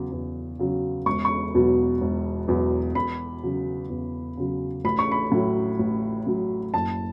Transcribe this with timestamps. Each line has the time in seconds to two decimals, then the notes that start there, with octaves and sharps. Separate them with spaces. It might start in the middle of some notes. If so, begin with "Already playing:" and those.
Already playing: E2 C#3 F#3
0.12 E2
0.59 C#3 F#3
1.06 E1 C#6
1.25 C#6
1.54 E2 B2 F#3
2.01 E1
2.48 E2 B2 F#3
2.95 E2 B5
3.43 C#3 F#3
3.90 E2
4.37 C#3 F#3
4.85 A1 B5
4.99 C#6
5.12 B5
5.32 A2 F#3
5.79 A1
6.27 A2 F#3
6.74 F#1 A5